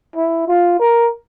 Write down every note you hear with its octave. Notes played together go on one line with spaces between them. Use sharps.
E4
F4
A#4